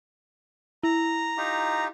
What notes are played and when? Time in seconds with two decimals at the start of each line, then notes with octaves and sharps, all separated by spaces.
0.83 E4 A#5
1.37 D#4 F4 G4